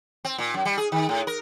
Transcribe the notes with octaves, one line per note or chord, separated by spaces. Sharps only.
C4
A#2
F#2
G3
G#4
D#3
A2
A#4